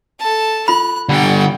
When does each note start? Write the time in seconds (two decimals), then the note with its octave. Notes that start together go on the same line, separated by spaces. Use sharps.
0.19 A4 A5
0.68 F4 B5 F#6
1.09 D3 G3 F#5 G5